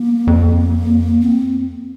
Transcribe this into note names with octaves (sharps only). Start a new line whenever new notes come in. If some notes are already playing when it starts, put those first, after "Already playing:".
Already playing: A#3
F2
C4